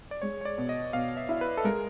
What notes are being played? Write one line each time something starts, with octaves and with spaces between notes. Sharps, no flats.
D5
G#3 C#5
C#5
D5
B2
D#5
B2 F5
E5
E4
B4
A4
G#3 A#4